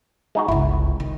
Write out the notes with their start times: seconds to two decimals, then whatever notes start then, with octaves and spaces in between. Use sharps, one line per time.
0.35 G#3 D#4 F#4
0.48 G1 C#2 E4
1.00 D#3